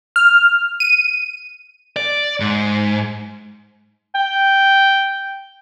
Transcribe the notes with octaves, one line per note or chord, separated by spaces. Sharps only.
F6
D#7
D5
G#2
G5